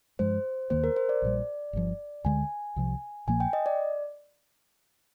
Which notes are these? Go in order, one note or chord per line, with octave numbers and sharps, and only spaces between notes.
G2 F3 G#3 C5
D#2 D#3 A#3 C5
A#4
C5
D5
A#1 A#2 G3
G1 G2 F3
D2 D3 G#3 G#5
C2 C3 F3
A#1 A#2 F3 A#3 G#5
G5
D#5
D5